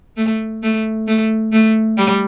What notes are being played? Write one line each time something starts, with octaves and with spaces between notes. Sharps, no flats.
A3
A3
A3
A3
G3